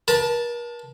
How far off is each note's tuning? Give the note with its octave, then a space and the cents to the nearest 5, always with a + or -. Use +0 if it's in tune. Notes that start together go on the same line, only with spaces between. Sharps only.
A#4 +40 A5 +0